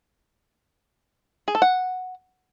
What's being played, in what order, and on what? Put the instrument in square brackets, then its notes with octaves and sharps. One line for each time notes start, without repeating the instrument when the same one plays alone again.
[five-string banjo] G#4
A4
F#5